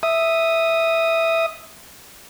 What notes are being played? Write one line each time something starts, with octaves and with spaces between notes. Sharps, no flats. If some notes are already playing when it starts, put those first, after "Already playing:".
E5 D#6